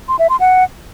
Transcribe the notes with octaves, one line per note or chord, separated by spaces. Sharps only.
C6
E5
C6
F#5